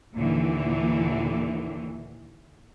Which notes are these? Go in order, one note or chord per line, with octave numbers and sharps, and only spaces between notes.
D#2 A#2 D3 E3